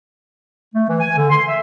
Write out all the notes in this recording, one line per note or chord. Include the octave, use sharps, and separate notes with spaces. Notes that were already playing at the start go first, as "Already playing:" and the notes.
A3
E3
G#5
D3
C6
E5